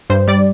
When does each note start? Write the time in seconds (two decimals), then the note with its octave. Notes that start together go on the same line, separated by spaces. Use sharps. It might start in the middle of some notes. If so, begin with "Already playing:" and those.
0.10 G2 C5
0.28 G3 D5